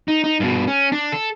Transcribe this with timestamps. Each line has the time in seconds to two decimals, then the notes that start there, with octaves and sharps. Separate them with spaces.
0.08 D#4
0.24 D#4
0.40 G2 B2
0.68 C#4
0.92 D4
1.12 A4